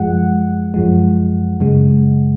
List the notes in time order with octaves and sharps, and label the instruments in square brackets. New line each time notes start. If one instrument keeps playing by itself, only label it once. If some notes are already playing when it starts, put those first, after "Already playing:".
Already playing: [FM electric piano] F#2 F3 G#3 F#5
F#2 F3 G#3
F#2 C#3 G#3